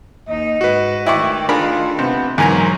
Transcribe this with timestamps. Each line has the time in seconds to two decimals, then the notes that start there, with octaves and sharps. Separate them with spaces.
0.28 D#2 D#4 D#5
0.61 G#2 F#4 B4
1.06 D#3 A3 E4 D5 G5 C#6
1.49 D4 F4 G#4 A#4 B5
1.99 C3 B3
2.38 E2 G#2 F#3 C4 A#4 G#5 A#5